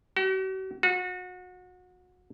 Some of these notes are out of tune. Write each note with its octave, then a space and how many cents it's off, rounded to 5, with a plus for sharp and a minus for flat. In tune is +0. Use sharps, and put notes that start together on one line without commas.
F#4 +45
F#4 -30